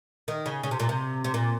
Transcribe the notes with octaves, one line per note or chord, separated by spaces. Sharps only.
D#3
C#3
C#3
C3
A#2
C3
C3
A#2